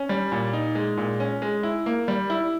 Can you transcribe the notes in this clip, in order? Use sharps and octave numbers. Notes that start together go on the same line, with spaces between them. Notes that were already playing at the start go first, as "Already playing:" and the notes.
Already playing: C#4
G3
A#2
D#4
G#3
A#2
C#4
G#3
E4
A#3
G3
E4